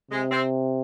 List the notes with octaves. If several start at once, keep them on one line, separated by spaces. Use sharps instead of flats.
C3 G#3
C4